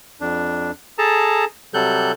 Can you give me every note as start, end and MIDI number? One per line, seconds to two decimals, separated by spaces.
0.21 0.71 41
0.21 0.71 62
0.98 1.45 68
0.98 1.45 69
0.98 1.45 81
0.98 1.45 82
1.74 2.12 48
1.74 2.12 54
1.74 2.12 55
1.74 2.12 69
1.74 2.12 90
1.74 2.12 91